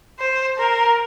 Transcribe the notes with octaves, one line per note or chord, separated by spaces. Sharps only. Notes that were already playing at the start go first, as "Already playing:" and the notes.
C5
A#4